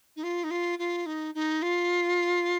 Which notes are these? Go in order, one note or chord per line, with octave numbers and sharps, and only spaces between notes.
D#4
F4
D#4
F4
F4
D#4
D#4
F4